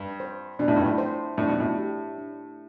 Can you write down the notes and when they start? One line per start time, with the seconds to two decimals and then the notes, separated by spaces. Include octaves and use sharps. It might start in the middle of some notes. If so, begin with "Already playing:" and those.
Already playing: G2
0.20 C5
0.59 B2 D4
0.68 A2
0.76 G2
0.85 A2
0.98 C5
1.38 A2 D4
1.49 B2
1.60 A2
1.77 G4
2.18 D4